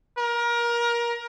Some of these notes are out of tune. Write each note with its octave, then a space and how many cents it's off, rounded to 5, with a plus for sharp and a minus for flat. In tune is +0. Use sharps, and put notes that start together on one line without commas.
A#4 +25